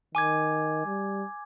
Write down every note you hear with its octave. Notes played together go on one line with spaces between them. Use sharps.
D#3 G#5 D6 G#6
G3